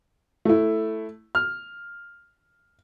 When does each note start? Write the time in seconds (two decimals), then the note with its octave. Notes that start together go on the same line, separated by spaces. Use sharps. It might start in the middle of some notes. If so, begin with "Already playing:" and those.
0.45 A3 E4
1.35 F6